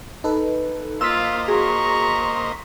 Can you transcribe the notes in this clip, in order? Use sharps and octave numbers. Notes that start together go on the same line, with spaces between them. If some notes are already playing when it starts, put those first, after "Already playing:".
D#4 A4 B4
A#3 F4 C5 D#5 F5 C6 E6 B6
F#4 G#4 A#5 C#6